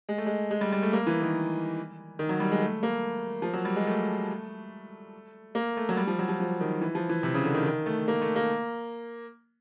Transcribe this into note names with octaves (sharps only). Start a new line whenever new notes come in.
G#3
A3
G#3
G#3
G3
G3
A3
A#3
E3
D#3
D#3
F#3
G3
G#3
A3
A#3
F3
F#3
G3
G#3
A3
A#3
A3
F#3
G3
F3
F#3
F3
F3
D#3
E3
F3
E3
C3
C#3
D3
D#3
D#3
A3
A#3
A3
A#3